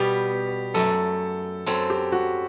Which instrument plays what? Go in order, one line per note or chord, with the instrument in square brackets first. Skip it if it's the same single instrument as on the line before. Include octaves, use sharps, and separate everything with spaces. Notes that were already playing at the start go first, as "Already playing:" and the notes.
Already playing: [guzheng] B2 G3 B3 [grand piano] G4
[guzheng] F#2 F#3 A3 [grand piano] A4
[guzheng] F#2 F#3 C4 [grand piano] A4
[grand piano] G4
F#4